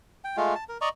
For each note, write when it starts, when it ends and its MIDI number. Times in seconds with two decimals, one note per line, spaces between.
0.24 0.37 79
0.37 0.55 56
0.37 0.55 57
0.37 0.55 65
0.55 0.64 81
0.69 0.78 70
0.81 0.89 74
0.81 0.89 75
0.81 0.89 82
0.81 0.89 85